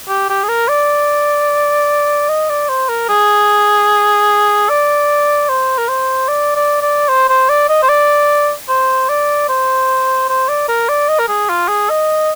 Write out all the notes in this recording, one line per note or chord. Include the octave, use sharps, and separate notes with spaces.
G4
G4
G#4
A#4
D5
D#5
D5
C5
A#4
G#4
D5
C5
A#4
C5
D5
D5
D5
C5
C5
D5
D#5
C5
D5
C5
D5
C5
C5
D5
A#4
D5
D#5
A#4
G#4
F4
G#4
D#5